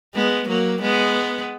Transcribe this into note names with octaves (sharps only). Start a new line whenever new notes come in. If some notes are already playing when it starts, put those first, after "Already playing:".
G#3 B3
F#3 A#3
G#3 B3